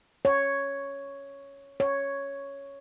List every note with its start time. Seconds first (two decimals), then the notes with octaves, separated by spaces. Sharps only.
0.25 C#5
1.80 C#5